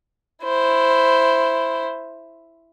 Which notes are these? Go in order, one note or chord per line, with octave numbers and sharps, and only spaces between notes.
E4 C5